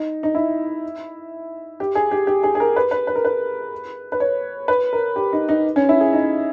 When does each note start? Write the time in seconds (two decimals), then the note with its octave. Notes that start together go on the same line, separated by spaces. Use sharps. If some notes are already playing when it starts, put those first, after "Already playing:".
Already playing: D#4
0.23 D#4
0.35 E4
1.80 G4
1.95 G#4
2.11 G4
2.27 G4
2.43 G#4
2.55 G#4
2.60 A#4
2.76 B4
2.91 B4
3.07 B4
3.16 A#4
3.25 B4
4.12 B4
4.20 C#5
4.68 B4
4.93 A#4
5.16 G4
5.33 D#4
5.49 D#4
5.76 C#4
5.89 E4
6.01 G#4
6.13 D#4